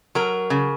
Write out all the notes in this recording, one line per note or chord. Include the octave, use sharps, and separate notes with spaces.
F#3 A#4
C#3